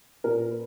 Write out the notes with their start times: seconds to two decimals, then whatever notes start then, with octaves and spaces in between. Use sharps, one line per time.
0.24 A#2 A#4
0.51 B4